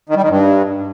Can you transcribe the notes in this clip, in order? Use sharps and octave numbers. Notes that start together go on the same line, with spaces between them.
D#3
G3
D#3
G2